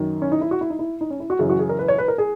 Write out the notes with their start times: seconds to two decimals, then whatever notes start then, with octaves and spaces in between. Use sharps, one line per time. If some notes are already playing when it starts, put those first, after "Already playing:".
Already playing: F#2 D#3
0.22 C#4
0.32 D#4
0.41 E4
0.51 F#4
0.61 E4
0.70 D#4
0.79 E4
1.01 D#4
1.10 C#4
1.20 E4
1.30 F#4
1.39 F#2 C#3 E3 G#4
1.50 F#4
1.59 G#4
1.69 A#4
1.79 B4
1.88 C#5
1.98 B4
2.08 A#4
2.18 G#4